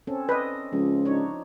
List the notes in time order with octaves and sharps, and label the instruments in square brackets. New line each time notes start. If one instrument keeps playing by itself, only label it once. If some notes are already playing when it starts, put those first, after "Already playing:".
[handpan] C4 C#4 A4
[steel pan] B4 [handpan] D5 D#5
[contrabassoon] C#2 [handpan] F3
[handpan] D4 D#4 C#5